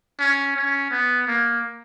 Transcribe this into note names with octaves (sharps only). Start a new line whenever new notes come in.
C#4
C#4
B3
A#3